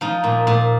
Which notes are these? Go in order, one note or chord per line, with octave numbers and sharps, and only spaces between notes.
F3 D#4
A#2
A#2